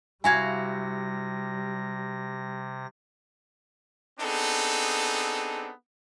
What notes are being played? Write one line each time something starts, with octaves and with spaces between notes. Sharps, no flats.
C3 G3 E4 F#4 F5 G#5 G#6 A#6
B3 C4 D4 D#4 G#4 A4